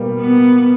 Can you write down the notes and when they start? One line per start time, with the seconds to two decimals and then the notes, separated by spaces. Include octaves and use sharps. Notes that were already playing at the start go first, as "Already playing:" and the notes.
Already playing: B2 G3 A#3
0.20 B3